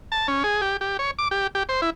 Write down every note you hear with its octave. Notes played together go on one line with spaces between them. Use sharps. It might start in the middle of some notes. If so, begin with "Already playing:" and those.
A5
C#4
G#4
G4
G4
C#5
D6
G4
G4
C5
E4